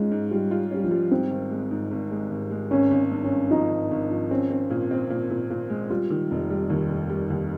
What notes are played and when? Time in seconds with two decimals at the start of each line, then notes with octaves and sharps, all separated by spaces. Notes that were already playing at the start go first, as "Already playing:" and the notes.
Already playing: G#2 G#3 C#4 F4
0.11 G#2
0.31 G3 F4
0.51 F4
0.71 G3 C#4
0.84 F3
0.91 G3
1.11 G#2 C4
1.31 G#1
1.51 G#3
1.71 G#2
1.91 G#1
2.11 G#3
2.30 G#1
2.51 G#3
2.71 G#1 C#4
2.91 G#1
3.11 G2
3.24 C#4
3.31 G2
3.51 F3 D#4
3.70 G#1
3.91 G#1
4.11 F3
4.30 C4 C#4
4.51 C4
4.70 A#2
4.91 C4
5.10 A#2
5.30 A#2
5.50 A#2
5.70 G#3
5.90 G3 F4
6.10 D#3
6.31 F1
6.50 G3
6.70 D#2
6.91 F1
7.09 G3
7.30 D#2